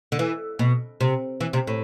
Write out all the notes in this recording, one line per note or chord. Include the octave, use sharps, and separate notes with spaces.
D3
E3
B2
C3
E3
C3
A2